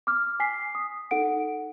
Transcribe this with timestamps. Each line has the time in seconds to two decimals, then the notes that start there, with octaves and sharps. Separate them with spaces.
0.07 D6 F6
0.40 G#5 B6 C7
0.75 D#6
1.11 D#4 A4 F#5 D7